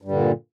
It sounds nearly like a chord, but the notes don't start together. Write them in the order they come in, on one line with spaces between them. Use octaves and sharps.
G2 G3 D3 A#2